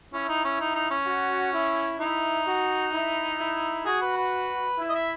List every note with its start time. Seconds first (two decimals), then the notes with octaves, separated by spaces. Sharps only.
0.13 C#4 E4
0.29 D#4
0.45 C#4
0.60 D#4
0.75 D#4
0.91 C#4
1.06 F#4
1.53 E4
1.99 D#4 E4
2.46 F#4
2.93 E4
3.39 E4
3.86 F#4 G#4
4.02 B4
4.17 B4
4.79 E4
4.89 D#5
4.95 E5